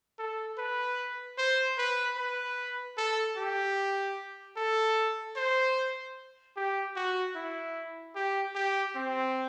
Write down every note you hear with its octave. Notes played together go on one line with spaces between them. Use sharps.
A4
B4
C5
B4
B4
A4
G4
A4
C5
G4
F#4
E4
G4
G4
C4